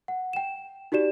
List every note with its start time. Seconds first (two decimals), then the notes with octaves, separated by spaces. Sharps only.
0.08 F#5
0.33 G5 E7
0.92 D#4 F#4 G4 D5 E7